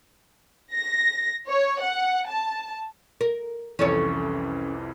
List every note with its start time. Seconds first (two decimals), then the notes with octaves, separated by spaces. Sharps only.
0.73 A#6
1.49 C#5
1.81 F#5
2.28 A5
3.21 A#4
3.79 C2 F2 E3 C#4 A4 C#5